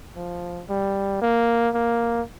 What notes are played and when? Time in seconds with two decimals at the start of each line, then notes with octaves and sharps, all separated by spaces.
0.16 F3
0.69 G3
1.22 A#3
1.74 A#3